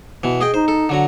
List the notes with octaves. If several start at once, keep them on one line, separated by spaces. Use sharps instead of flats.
B2 E3
G#4 D#5 G5
D#4 C5
A4
D3 F#3 A#5